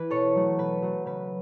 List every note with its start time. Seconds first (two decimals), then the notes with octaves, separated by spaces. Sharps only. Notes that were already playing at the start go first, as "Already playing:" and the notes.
Already playing: E3 B4
0.10 B2 A4 C#5
0.35 F#3 A3
0.58 B2 B4
0.82 F#3 A3
1.06 C#3 B4